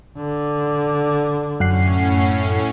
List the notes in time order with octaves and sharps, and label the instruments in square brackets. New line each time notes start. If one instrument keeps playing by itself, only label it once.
[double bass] D3
[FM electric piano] F#2 F#5 C7 [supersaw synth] A2 C#4